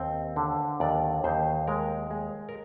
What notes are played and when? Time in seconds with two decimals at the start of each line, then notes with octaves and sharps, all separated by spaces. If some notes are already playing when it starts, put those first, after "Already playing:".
Already playing: D#2 C4
0.36 D3
0.80 D#2 D5
1.24 D#2 C5
1.67 G#3 A#4
2.11 G#3
2.49 A#4